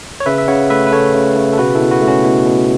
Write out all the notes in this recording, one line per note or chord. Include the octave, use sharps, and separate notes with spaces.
C#5
C#3 B4 E5
E5
C#3 C#5 F#5
A3 B4 E5
B4
A3 A4 C#5
C#3
C#3
A4
B2 F#4 B4
E4 A4
B2
F#4 B4
A3
C#4 F#4
B2 E4
B2